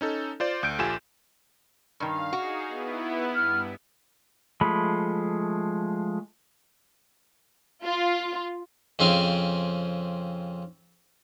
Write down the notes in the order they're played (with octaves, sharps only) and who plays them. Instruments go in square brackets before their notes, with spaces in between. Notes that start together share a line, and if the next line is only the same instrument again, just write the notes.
[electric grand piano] C#4 D#4 A4
F4 C5 D5
D2 G6 D7
A#1 F4 G4 A4 G#5 E7
[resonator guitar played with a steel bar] G2 D#3 [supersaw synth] F5
[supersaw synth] D#4 G#4 [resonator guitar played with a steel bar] F#4
[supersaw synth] B3 E4
[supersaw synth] G2 [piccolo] F6
[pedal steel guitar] F3 G#3 A3 B5
[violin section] F4
[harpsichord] F2 C#3 C4 G#4 F5